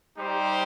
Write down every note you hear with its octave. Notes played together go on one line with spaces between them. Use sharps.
G3 D#4 G4 C5